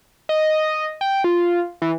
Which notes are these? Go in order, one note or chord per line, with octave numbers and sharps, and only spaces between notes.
D#5
G5
F4
E3